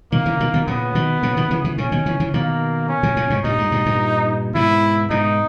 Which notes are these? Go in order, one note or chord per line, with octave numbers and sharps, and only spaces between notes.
B2 D#3 A#3
C#3 E3
B2 D#3
B2 D#3
A#2 C#3 B3
B2 D#3
A#2 C#3
B2 D#3
C#3 E3
C#3 E3
A#2 C#3 C#4
B2 D#3
C#3 E3
C#3 E3
B2 D#3 A#3
C#4
A#2 C#3
A#2 C#3
G#2 B2
G2 A#2 D#4
G2
G2 A#2
G2 A#2
G#2 B2 E4
G#2 B2 D#4